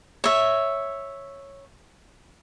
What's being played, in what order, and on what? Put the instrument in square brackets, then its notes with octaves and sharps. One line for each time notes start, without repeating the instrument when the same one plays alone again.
[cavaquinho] C#5 E5